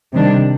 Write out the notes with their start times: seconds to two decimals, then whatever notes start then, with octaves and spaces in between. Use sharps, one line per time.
0.12 C3 D#3 G3 D4